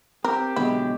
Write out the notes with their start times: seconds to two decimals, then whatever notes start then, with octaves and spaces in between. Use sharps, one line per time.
0.24 C4 G4 A#4
0.56 B2 D3 F#3 G#3 B3 E4